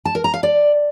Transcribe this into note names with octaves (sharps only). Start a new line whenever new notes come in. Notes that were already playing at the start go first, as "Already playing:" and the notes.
A5
A#4
A#5
F5
D5